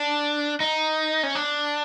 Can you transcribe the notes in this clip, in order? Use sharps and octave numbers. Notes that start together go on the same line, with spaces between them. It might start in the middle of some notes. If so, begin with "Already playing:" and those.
Already playing: D4
D#4
C#4
D4